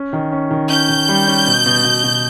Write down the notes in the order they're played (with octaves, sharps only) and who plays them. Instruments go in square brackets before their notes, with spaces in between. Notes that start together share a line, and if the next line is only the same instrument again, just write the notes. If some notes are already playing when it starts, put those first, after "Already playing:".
Already playing: [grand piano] C#4
D#3
C#4
D#3
[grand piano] C#4 [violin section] G6
[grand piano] D#3
G3
C#4
B2
B2
B2
B2